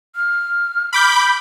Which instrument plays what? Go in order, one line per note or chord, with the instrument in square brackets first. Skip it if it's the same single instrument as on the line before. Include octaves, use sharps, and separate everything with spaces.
[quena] F6
[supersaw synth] B5 D6 G6